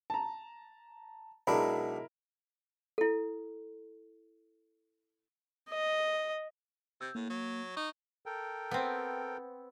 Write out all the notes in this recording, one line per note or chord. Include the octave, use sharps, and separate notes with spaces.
A5 A#5
B1 G#3 D4 E4 A#4 B5
E4 A4
D#5
C3 E6 G6
A2 A#3
F#3
D#4 C#6
A4 A#4 G5
B3 C4